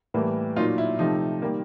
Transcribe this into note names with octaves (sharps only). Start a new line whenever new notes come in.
A2 E3 G3 A#3
A#2 F#3 A#3 D#4 F4
E4
C3 F3 A3 D#4
D#3 G3 A#3